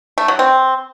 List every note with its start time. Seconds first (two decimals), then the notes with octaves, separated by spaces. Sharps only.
0.18 A3
0.28 F#3
0.39 C4